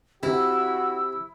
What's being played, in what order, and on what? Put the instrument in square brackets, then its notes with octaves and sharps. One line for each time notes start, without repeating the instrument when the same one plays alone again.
[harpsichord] C3 [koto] E4 [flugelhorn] F#4 [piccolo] E6